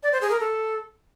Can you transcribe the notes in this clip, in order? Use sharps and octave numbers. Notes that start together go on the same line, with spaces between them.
D5
C5
G#4
A#4
A4